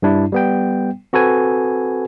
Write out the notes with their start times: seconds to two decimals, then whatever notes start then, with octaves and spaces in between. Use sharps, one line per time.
0.02 G2 G3 D4 E4
0.32 G3 B3 G5
1.13 C4 F#4 A4 B4 G#5